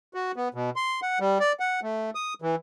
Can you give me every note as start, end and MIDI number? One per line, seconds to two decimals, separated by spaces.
0.14 0.32 66
0.36 0.48 59
0.54 0.70 47
0.76 1.00 84
1.02 1.19 78
1.20 1.38 55
1.40 1.52 74
1.60 1.80 78
1.83 2.10 57
2.15 2.34 87
2.42 2.55 52